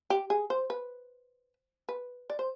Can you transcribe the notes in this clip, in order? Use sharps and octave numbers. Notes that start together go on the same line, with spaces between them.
G4
G#4
C5
B4
B4
D5
C5